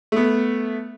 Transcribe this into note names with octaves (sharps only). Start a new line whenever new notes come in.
A3 B3